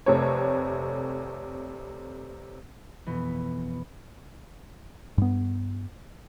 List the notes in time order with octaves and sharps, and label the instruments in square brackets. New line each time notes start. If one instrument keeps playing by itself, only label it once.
[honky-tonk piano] F1 C3 A3 C#5
[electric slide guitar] F2 B2 E3 B3
[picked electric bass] G2 B3